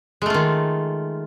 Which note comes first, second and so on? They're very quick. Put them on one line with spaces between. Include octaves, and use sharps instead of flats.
G#3 A3 F4 D#3